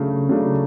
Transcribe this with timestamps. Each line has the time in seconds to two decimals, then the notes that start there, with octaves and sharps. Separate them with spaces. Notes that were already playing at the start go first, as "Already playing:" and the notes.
Already playing: C#3 F#3 A3 D4
0.29 C#3 F#3 A3 D4